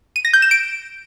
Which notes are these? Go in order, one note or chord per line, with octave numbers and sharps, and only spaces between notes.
D#7
A#6
G6
E7
D7